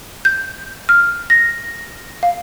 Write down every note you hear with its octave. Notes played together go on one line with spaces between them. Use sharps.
G6
F6
A#6
F5